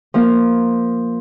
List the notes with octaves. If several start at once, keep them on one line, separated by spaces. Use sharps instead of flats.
F3 A#3 F4